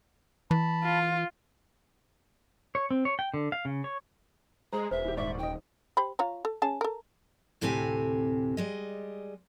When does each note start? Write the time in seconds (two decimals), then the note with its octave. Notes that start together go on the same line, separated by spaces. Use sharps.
0.51 E3 A5 B5
0.84 F4
2.75 C#5
2.91 C4
3.05 C#5
3.19 G5
3.34 D3
3.52 F5
3.65 C#3
3.84 C#5
4.73 G#3 G#4 C5 A#5
4.91 E1 G#4 B4 C5 E5
5.04 D#1 E4 G4
5.17 G#2 D5 E5 C#6
5.39 D#3 D#5 G5
5.97 G4 C5 B5
6.19 F4 C#5 A#5
6.45 A4
6.62 C#4 G#4 A5
6.81 A4 A#4
7.61 D2 A2 C3 C4 G4 G#5
8.57 G3 G#3 D#5